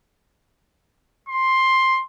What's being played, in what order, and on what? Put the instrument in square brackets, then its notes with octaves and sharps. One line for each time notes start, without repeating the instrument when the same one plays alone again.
[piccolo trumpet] C6